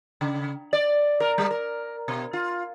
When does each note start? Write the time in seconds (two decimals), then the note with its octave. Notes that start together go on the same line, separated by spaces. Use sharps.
0.21 C#3
0.73 D5
1.20 A#4
1.38 G3
1.51 A#4
2.08 B2
2.33 F4